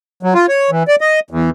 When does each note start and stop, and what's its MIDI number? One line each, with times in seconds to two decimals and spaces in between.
0.23 0.34 54
0.34 0.46 65
0.48 0.70 73
0.71 0.83 52
0.88 0.96 74
1.01 1.20 75
1.31 1.50 40